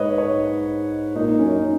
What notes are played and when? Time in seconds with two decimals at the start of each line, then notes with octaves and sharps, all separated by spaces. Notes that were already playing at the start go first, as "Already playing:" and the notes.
Already playing: G#2 B4 C#5 D#5
0.18 C#5
1.15 A#2 D#4
1.39 F#2 C#4
1.56 D#4